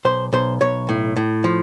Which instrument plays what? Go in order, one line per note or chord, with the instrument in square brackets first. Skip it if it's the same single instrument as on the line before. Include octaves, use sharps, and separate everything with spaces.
[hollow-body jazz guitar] B1 C5
B1 C5
B1 C#5
A2
A2
F3